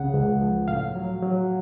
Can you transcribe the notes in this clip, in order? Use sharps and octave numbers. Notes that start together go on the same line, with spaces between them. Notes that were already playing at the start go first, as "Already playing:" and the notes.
Already playing: C#2 C#3 F#5
C#2
F3
A2 F5
F#3
F#3